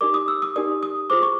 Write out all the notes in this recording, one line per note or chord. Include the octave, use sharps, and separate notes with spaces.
D#4 G4 A#4 D5 D6
D#6
E6
D#6
D#4 G4 A#4 D5 D#6
D#6
F4 G#4 C5 D6
C#6